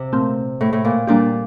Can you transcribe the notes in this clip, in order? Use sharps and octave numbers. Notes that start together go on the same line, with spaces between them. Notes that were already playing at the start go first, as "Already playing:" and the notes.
Already playing: C3
A#2 A3 C4
A2
A2
A#2
A#2 G3 A#3 D4 G4